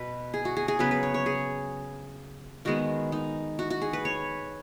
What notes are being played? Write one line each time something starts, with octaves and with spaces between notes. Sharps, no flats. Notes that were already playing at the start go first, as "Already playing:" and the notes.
Already playing: B2 B4
G#4
F#4
G#4
G#4
C#3 F#3 B3 B4
B4
C#5
C#5
G#4
D#3 G#3 B3 F#4
D#4
F#4
F#4
G#4
B4
C#5